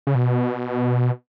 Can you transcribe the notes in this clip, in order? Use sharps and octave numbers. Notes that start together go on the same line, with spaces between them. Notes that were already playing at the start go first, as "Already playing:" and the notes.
C#3
B2